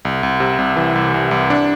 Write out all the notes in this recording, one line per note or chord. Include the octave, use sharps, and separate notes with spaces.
C2
C2
C3
C2
E3
C2
C2
C2
D4